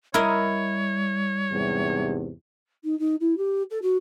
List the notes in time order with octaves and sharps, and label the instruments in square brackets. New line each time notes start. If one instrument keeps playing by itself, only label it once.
[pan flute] G3 [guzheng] E4 A#4 D#5 [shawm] C#5
[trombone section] E2 G#2 C3
[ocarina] D#4
D#4
E4
G4
A4
F#4